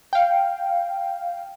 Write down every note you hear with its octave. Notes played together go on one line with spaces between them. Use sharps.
F5 G5